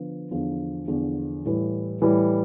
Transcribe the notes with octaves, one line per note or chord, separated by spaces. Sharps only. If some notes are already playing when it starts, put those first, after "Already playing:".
Already playing: D3 F3 B3
E2 D3 F3
E2 D3 F3
A2 E3 G3
A2 E3 G3